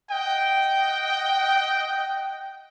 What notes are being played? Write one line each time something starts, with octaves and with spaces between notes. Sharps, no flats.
D#5 F#5 G5